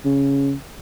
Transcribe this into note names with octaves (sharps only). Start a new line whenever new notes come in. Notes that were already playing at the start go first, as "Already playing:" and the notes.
C#3